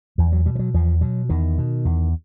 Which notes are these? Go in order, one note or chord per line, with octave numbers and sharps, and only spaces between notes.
E2 F3
F#3
B2 G3
F3
F#3
E2 F3
B2 F#3
E2 D#3
B2
E2